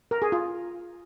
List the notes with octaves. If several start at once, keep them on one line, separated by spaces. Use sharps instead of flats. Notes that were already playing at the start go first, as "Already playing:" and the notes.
A#4
G#4
F4